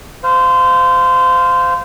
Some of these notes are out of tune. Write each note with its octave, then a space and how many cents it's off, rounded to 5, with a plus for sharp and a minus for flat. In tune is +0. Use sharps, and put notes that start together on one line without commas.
C5 -20 F5 +0